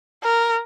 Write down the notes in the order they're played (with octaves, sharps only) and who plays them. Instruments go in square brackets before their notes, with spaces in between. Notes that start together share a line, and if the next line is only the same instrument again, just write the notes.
[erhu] A#4